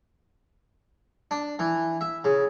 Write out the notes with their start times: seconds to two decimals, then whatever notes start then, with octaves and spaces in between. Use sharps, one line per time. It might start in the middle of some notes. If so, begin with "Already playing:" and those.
1.31 D4
1.59 E3
2.01 E5
2.24 C#3